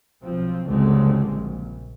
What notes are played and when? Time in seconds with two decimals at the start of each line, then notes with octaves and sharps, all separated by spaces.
0.24 B1 F3 C4
0.68 F#1 C#2 G2 D3 G#3 C4
1.28 A#1